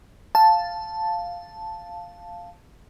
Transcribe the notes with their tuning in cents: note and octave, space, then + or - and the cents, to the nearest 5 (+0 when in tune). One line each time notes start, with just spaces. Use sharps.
F5 +0 A5 +0